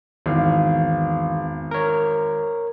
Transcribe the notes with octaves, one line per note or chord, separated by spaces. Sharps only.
G#1 E2 F5
A#4 C#5